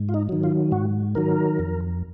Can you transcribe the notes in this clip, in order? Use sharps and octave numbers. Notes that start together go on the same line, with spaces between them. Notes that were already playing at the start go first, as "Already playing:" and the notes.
Already playing: G#2
F4
D#4
D#3 F#3
F4
G#2 F#4
D#3 F#3 A#4
F2